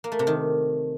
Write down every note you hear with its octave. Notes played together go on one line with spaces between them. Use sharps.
A#3
A3
C3
D#3